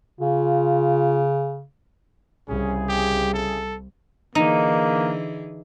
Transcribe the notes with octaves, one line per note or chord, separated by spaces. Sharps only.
C#3 F4
C2 C#3 C#4 E4 G#4
G4
A4
D3 E3 A#3 D#4 G#4